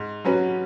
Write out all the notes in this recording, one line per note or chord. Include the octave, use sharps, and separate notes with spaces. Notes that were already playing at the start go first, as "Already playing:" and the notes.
Already playing: G#2
F#3 C#4 F#4 B4